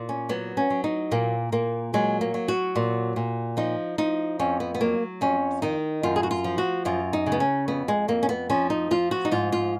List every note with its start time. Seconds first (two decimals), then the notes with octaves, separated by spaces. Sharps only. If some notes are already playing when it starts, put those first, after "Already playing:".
Already playing: A#2
0.09 C#4
0.29 F#3 B3
0.57 C#4
0.70 F#3
0.84 D#4
1.11 A#2 A#3
1.52 A#2 A#3
1.94 F#3 G#3
2.21 A#3
2.34 F#3
2.48 F#4
2.76 A#2
3.16 A#2
3.57 F3 D#4
3.98 F3 D#4
4.39 F2 C#4
4.60 B3
4.74 B3
4.81 F#3 A#3
5.21 F2 C#4
5.62 D#3 D#4
6.03 F#2 F4
6.16 G#4
6.23 F#4
6.31 F4
6.44 F3
6.58 F#4
6.85 F#2 F4
7.13 D#4
7.26 C#3
7.32 B3
7.40 C#4
7.68 F2 B3
7.88 G#3
8.08 F2 A#3
8.23 C#4
8.29 B3
8.50 F3 C#4
8.70 D#4
8.91 F3 F4
9.11 F#4
9.25 D#4
9.31 G#2 F4
9.52 F4